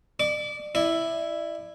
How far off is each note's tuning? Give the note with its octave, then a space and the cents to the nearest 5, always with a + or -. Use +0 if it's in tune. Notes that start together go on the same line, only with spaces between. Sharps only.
D5 +35 D6 -30
E4 +0 D5 +35